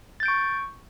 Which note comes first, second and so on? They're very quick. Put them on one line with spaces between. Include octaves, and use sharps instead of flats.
A6 G6 D7 C#6